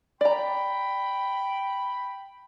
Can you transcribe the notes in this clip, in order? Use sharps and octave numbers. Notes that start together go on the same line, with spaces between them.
D5 G5 A#5 B5